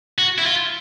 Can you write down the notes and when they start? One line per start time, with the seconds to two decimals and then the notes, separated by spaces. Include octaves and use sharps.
0.18 F#4
0.38 E4
0.46 F4